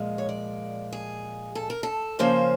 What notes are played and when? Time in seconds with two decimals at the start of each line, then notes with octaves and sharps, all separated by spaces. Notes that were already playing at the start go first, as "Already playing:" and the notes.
Already playing: A#2 F3 G#3
0.18 C#5
0.29 D5
0.93 G#4
1.55 A4
1.70 A#4
1.83 A4
2.19 C#3 F3 A#3 C#4 C5